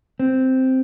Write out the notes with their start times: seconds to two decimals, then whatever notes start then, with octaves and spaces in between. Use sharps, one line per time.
0.20 C4